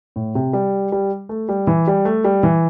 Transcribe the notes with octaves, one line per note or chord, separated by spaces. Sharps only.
A2
C3
G3
G3
A3
G3
E3
G3
A3
G3
E3